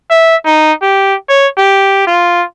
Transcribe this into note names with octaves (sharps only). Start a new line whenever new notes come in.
E5
D#4
G4
C#5
G4
F4